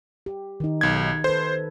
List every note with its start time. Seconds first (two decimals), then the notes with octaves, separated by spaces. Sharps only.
0.26 G4
0.60 D#3 D#4
0.81 B1 G#6
1.24 A4 B4 C5